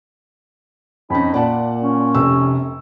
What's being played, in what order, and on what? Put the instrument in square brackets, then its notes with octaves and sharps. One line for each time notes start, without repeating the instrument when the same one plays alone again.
[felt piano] F2 C#4 [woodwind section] D#4 B5
[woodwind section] A#2 A#3 [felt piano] D5 F#5 A5
[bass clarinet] C#4
[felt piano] F1 C3 E6